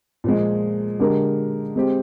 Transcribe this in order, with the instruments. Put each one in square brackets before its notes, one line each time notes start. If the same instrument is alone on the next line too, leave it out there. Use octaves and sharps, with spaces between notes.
[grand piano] A#2 F3 G#3
D3 G#3 D4 G4 A#4
G#3 C4 G4